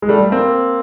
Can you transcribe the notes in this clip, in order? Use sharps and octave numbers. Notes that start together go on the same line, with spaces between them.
G#3
G3 A3
A#3 C4